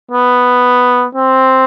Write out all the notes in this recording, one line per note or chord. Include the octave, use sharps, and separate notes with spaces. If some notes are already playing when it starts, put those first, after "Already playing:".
B3
C4